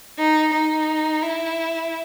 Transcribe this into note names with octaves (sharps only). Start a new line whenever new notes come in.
D#4
D#4
E4